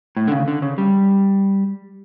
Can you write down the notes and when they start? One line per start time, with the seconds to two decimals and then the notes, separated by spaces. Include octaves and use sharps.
0.17 A2
0.27 D3
0.32 C#3
0.48 D3
0.62 C#3
0.78 G3